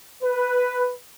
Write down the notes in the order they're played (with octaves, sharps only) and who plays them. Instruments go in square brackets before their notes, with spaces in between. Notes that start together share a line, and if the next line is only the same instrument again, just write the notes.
[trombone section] B4